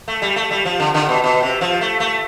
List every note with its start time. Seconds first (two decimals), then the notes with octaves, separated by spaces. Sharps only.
0.08 A3
0.22 G3
0.36 A3
0.51 G3
0.65 F3
0.80 D3
0.94 D3
1.09 B2
1.24 B2
1.43 C3
1.61 F3
1.81 A3
2.00 A3